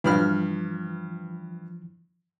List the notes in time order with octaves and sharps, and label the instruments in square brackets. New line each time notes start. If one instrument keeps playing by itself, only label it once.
[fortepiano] G2 B5 F6 [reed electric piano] E3 F3